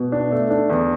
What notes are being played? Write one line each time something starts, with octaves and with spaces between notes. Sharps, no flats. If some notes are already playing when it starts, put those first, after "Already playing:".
Already playing: B2
D4
A3
D4
E2